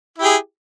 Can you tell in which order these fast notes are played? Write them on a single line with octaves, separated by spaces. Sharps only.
E4 G4 G#4